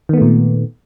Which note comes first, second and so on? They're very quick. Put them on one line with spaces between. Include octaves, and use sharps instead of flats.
D#3 B3 A3 A#2